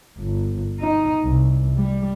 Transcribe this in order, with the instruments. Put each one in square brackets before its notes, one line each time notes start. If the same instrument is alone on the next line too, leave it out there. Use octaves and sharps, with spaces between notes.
[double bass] G1
D#4
C2
G3